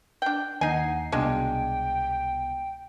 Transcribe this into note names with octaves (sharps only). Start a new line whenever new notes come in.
D4 G5
D#2 D#4 F#5 G#5 A#5 C7
C2 B2 G#3 D4 F4 G5